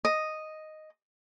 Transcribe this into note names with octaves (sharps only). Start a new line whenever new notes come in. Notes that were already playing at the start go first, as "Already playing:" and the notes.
D#5